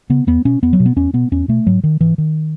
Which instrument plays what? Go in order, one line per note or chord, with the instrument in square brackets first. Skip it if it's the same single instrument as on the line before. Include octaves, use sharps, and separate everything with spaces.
[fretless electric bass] C#3 B3
E2 B3
B2 C#4
E2 B3
F#3
B2
B3
E2 C#4
B2 B3
E2 C#4
B2 A3
G#2 F#3
D#3
G#2 E3
D#3